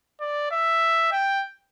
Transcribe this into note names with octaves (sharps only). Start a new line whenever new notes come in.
D5
E5
G5